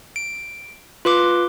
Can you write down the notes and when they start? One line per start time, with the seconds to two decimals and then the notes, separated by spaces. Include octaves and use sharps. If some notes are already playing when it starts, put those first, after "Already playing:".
0.16 D7
1.05 F4 B4 C6 D6